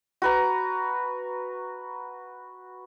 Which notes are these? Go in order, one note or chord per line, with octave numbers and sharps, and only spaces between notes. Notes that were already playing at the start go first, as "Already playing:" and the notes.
F#4 B4 A#5